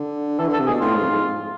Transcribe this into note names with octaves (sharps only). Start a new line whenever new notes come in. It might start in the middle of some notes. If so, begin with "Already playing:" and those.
Already playing: D3
E3 A4
D3 A4
C3
G#4
B2
A2 F4
G#2
F2
G#2